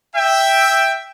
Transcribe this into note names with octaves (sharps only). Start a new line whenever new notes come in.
E5 G5